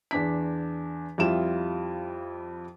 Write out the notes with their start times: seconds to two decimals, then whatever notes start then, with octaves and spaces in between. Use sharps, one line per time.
0.11 E2 D4 B6
1.18 F2 G3 E4 F4 E7